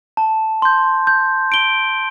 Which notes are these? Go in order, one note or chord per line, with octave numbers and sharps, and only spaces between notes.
A5
C6 G6
G6
D7 G7